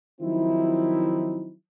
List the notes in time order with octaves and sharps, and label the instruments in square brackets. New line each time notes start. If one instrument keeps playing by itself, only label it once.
[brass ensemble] D#3 F3 F#3 C4 D#4 E4